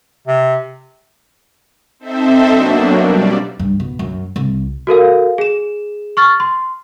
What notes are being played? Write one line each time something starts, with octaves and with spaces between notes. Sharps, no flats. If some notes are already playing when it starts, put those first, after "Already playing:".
C3
C4 D#4 A4 C5 E5
B2 F#3 A#3 D4
G3 D5
G2
B2
F#2
C2
F#4 A4 A#4 F5
G#4 E7
C#6 F6 A6
C6